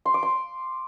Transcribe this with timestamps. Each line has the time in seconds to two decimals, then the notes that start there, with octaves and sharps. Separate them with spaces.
0.06 C6
0.14 D6
0.23 C6